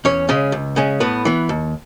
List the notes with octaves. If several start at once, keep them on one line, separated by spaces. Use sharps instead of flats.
E2 C#4 C#5
C#3 G#3 C#4
C#2
C#3 G#3 C#4
A2 B3 B4
E3 B3
D#2